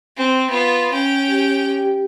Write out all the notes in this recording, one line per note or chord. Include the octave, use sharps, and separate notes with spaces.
C4
B3 F4
C#4 G5
G4